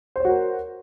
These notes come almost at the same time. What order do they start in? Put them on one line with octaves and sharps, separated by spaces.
C5 C#5 F#4 A#4